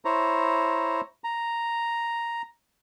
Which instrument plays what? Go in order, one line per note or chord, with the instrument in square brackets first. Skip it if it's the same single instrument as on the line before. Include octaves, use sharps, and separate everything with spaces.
[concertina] E4 C5 C#5 A#5
A#5